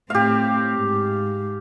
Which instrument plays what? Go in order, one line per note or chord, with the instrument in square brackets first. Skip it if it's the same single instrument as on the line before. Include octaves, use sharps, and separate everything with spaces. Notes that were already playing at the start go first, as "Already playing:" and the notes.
[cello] A2 C4 [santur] G4 F5
[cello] G#2